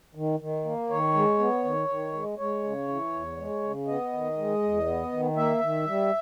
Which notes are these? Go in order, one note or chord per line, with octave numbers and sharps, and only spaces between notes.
D#3
D#3
A#3
D#3 C#5
G#3
B3
D#3
D#3
G#3
G#3 C#5
C#3
E3
E2
G#3
C#3
B3 D#5
D#3
G#3
E2
B3
D#3
A#3 E5
D#3
G3